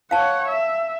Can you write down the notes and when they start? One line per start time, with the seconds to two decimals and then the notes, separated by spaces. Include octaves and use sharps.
0.11 C#5 F5 F#5 A5
0.48 E5